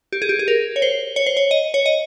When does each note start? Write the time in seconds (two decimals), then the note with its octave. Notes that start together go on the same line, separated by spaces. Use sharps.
0.12 G4
0.22 G#4
0.29 G4
0.39 G#4
0.48 A#4
0.76 C#5
0.82 C5
1.16 C#5
1.26 C5
1.37 C#5
1.51 D#5
1.74 C#5
1.86 D#5